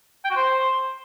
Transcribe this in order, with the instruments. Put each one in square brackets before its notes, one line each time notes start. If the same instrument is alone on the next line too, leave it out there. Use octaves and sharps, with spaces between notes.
[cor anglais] G5
F#4
C5